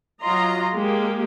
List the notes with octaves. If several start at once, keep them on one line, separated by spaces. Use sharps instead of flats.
F#3 F4 D#5 A#5 C6
G#3 A#3 G4